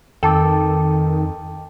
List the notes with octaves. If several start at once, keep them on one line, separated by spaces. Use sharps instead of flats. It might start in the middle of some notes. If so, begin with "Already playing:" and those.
F2 D#3 A4 G5 A5 D6